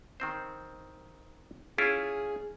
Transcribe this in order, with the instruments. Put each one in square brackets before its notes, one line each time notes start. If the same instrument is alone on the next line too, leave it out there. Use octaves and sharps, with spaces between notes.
[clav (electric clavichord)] D#3 C4 C5
[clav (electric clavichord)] C#4 E4 F4 [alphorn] G#4